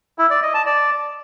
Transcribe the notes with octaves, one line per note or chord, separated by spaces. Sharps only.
E4
D5
D#5
A5
D5